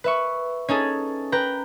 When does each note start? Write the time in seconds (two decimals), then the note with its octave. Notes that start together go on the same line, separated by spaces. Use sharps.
0.04 B4 E5 C#6
0.68 C#4 D#4 G#4 A4
1.32 B4 G5 A#5